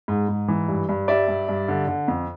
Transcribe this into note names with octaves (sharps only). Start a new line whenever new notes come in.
G#2
G#2
E3
G2
G2
G3 D5 E5
G2
G2
D3
D3
F2